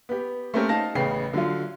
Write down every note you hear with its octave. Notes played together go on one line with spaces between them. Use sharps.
B3 G4
A3 A#3 C4 C#4 G4 A#4
D#4 F5 A5 A#6
A1 C#3 B3 G5 C7
D3 F#3 F4